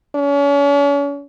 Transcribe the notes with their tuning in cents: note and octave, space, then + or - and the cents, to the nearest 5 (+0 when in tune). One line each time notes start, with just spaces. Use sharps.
C#4 +40